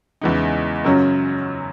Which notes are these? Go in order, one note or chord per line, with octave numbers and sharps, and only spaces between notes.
E2 C#3 E3 G#3 D#4
F#2 C#3 F#3 C#4